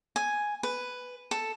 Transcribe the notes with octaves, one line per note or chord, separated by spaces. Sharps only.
G#5
B4
A4